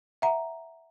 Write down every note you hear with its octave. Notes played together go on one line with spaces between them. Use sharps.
E5 F#5 A#5